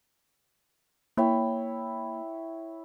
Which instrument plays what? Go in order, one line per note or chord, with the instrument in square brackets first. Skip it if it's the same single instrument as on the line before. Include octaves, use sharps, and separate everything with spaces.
[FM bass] A#3 [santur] E4 C#5 G5